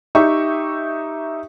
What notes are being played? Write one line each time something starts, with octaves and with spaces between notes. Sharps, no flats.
D#4 G4 E5 C#6